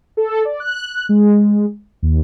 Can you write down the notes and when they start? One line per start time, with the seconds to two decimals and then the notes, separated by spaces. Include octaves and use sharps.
0.17 A4
0.45 D5
0.60 F#6
1.09 G#3
2.03 D#2